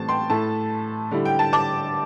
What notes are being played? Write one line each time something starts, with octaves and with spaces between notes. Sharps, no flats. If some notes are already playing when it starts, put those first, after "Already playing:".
Already playing: A2 E3 G3 C4 A5
G5 C6
A2 A3 E4 A5
D3 G3 E4
G5
A5
A5 D6